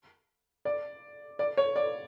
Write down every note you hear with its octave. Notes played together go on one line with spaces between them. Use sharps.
D5
D5
C#5
D5